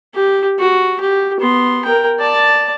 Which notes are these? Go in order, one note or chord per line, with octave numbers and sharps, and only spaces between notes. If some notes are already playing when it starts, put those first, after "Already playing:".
G4
F#4
G4
B3 C6
A#4 G5
D5 A5